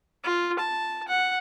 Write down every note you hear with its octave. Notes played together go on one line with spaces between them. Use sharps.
F4
A5
F#5